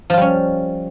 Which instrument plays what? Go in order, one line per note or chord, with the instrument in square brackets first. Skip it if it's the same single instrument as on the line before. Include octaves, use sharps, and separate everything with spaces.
[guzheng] F3
F4
G3
C#4